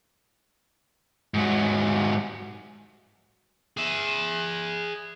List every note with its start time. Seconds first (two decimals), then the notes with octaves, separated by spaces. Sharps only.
1.34 G#2 F#3
3.77 G#4 E5